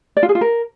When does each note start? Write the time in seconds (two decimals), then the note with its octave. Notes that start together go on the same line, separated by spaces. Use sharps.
0.17 D5
0.23 F4
0.29 G#4
0.35 F4
0.41 A#4